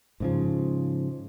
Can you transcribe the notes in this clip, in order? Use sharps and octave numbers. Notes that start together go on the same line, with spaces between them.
G#2 C#3 F3